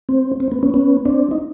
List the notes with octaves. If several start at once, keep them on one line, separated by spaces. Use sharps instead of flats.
C4
C4
B3
B3 C#4
B3 C#4
C4 D4
D#4